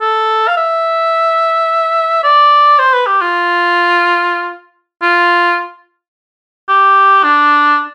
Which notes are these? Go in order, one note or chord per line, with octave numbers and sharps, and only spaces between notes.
A4
F5
E5
D5
C5
B4
G4
F4
F4
G4
D4